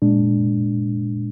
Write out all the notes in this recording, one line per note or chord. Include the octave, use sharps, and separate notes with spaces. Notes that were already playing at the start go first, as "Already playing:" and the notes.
A#2 G#3 D4